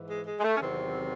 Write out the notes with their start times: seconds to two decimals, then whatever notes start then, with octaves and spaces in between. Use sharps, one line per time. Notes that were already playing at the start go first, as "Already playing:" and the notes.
Already playing: G#2 E3
0.09 G#3
0.25 G#3
0.39 G#3
0.43 A3
0.56 C#4
0.60 E2 C3 D#3 F#3 C4